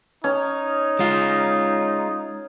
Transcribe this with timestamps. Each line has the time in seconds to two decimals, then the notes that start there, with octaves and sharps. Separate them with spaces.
0.24 C#4 D#4
0.99 G#3 F4